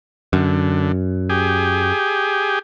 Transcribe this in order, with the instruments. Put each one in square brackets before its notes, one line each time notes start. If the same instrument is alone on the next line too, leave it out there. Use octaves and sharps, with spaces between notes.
[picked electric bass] F#2 [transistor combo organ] D3
[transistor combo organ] G4 G#4